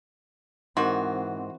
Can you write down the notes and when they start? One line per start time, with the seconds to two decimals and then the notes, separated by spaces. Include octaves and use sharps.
0.77 G#2 E3 C4 F#4 A#4 C6